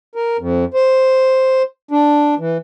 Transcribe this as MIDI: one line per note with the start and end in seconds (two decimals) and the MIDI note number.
0.15 0.37 70
0.39 0.65 41
0.74 1.62 72
1.91 2.35 62
2.38 2.57 52